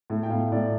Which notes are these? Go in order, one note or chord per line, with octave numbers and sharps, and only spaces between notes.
A2
G5
A2 F5
A2 D5